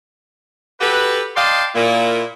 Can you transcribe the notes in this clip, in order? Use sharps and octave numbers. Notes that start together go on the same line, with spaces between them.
F#4 G4 A4 B4
D5 D#5 F5 G5 A5 C6
A#2 A#3 E4